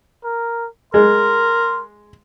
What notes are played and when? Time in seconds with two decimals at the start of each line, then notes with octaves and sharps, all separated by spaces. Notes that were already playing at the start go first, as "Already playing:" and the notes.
0.24 A#4
0.94 G#3 A#4 C6